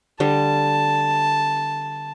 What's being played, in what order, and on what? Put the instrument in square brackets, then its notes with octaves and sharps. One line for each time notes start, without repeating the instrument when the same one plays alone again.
[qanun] D3 G3 [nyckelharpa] A5